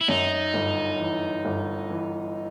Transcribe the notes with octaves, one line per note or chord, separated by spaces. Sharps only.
E4
F#2 D#4
G1
E3
G1
E3